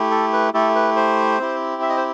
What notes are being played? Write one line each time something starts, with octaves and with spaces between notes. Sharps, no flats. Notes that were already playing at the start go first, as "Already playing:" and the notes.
Already playing: A3 E4 G4
A4
B4
A3 E4 G4 A4
B4
C5
C4 E4 G4
E5
D#5
C5